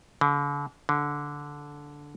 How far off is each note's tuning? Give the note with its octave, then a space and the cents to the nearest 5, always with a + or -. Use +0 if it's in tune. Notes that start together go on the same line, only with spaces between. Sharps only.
D3 -40
D3 -10